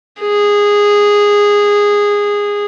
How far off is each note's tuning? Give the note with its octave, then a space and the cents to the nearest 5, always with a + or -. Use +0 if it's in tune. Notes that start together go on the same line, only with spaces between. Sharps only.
G#4 -15